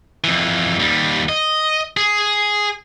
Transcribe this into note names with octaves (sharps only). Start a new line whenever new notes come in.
F2 E3
D#2 G3
D#5
G#4